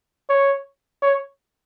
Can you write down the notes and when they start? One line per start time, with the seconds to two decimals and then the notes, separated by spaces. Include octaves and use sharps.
0.29 C#5
1.02 C#5